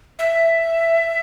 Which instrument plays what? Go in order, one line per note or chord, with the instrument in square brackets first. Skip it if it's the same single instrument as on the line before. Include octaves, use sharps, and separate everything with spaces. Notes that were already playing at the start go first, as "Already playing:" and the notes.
[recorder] E5